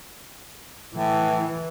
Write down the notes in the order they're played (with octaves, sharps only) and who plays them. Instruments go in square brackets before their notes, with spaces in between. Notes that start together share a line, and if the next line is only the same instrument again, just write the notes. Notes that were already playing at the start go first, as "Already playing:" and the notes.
[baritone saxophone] A2 [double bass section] E3